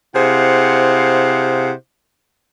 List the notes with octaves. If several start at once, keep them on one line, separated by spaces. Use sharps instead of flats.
C3 E4 G#4 C5 F5 F#5